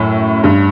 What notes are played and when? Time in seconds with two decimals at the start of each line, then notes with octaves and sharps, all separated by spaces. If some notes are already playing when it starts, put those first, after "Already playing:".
Already playing: F#2 A2
0.44 G2